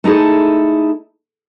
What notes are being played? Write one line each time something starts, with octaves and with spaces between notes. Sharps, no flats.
A3 D#4 E4 G#4 A4